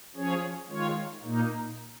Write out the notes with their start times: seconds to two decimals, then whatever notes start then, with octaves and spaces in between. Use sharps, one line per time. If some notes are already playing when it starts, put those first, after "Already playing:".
0.15 F3 C#4 G#4 C#5
0.69 D#3 G#3 F4 C#5
1.23 A#2 A#3 D#4